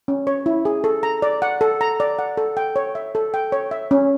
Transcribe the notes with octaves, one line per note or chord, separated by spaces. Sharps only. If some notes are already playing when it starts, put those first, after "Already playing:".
C#4
C#5
E4
G#4
A4
A#5
D5
F#5
A4
A#5
D5
F#5
A4
G5
C#5
E5
A4
G5
C#5
E5
C#4